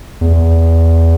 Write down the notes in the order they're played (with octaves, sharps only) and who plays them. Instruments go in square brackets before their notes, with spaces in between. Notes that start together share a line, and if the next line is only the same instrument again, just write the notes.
[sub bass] E2